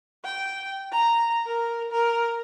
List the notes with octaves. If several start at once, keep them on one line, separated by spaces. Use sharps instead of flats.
G5
A#5
A#4
A#4